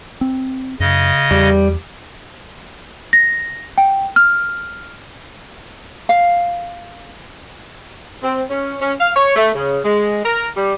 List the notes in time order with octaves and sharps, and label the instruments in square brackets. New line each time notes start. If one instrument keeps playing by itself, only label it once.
[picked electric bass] C4
[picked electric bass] F#2 [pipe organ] C#3 D#5
[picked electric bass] E2 [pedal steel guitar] G3
[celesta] A#6
G5
F6
[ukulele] F5
[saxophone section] C4
C#4
C#4
F5
C#5
A3
C#3
G#3
A#4
G3